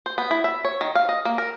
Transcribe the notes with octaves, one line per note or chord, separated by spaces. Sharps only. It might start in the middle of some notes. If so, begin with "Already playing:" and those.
C5
B3
E4
E5
C#5
D#3
F5
D#5
A#3
A#4